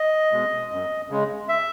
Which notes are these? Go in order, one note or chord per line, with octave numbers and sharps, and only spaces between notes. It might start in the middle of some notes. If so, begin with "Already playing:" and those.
Already playing: D#5
B2 G#3
F#2
C#3 G#3
E5